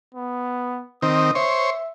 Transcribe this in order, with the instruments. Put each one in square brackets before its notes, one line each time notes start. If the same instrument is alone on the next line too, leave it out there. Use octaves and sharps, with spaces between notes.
[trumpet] B3
[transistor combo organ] D#3 C4 [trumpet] D#6
[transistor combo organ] C5 C#5 [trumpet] E5